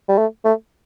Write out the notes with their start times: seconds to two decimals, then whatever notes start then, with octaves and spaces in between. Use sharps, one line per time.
0.09 G3
0.18 A3
0.45 A3